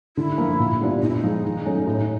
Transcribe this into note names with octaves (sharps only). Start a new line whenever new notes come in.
D3 E4
F3 A#3
A#2
G3 B3 D4 F4
A#2 D#4
E4
D#4
F3 G#3
D#3
F#3 A3 C#4
A2